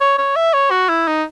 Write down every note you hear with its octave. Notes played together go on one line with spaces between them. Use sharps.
C#5
C#5
E5
C#5
F#4
E4
D#4